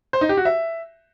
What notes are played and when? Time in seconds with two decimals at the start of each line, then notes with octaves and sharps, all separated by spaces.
0.13 C5
0.21 D#4
0.29 G4
0.37 F#4
0.45 E5